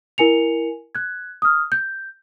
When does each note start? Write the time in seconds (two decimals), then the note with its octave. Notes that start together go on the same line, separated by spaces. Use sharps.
0.18 E4 A#4 G#5 C#7 F7
0.95 F#6 G#6
1.42 D#6 F6
1.72 G6